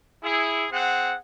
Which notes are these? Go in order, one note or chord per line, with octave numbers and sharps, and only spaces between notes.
E4 G#4
C4 G#4 F#5